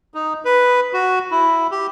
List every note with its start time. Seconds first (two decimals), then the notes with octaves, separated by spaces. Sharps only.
0.14 D#4
0.45 B4
0.93 F#4
1.31 E4
1.71 G4